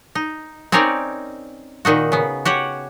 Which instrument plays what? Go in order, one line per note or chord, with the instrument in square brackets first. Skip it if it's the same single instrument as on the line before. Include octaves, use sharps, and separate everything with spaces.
[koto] D#4
C4 C#4 D#4 A#4 C#5 D5
A#2 D#3 D#4 F#4
C#3 B3
F#4 G4 C#5 F#5